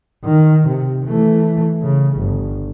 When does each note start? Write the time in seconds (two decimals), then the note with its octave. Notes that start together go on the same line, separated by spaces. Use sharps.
0.24 D#3
0.68 C3
1.05 E3 A3
1.82 C#3
2.17 G1